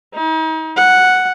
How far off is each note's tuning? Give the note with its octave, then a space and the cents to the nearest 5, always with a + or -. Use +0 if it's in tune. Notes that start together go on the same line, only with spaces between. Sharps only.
D#4 +40
F#5 +0